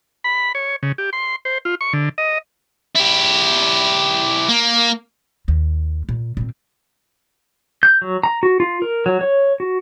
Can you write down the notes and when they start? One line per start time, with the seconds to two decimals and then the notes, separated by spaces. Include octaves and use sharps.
0.24 B5
0.55 C#5
0.83 C#3
0.98 G4
1.13 C6
1.45 C5
1.65 F4
1.81 C#6
1.93 D3
2.18 D#5
2.96 E4 G4
4.49 A#3
5.48 D#2
6.09 A#2
6.37 A#2 C4
7.83 G6
8.02 F#3
8.24 A#5
8.43 F#4
8.60 F4
8.82 A#4
9.06 F#3
9.21 C#5
9.60 F#4